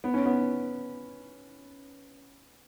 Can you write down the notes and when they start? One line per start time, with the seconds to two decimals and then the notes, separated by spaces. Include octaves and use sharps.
0.04 B3
0.14 C#4
0.26 B3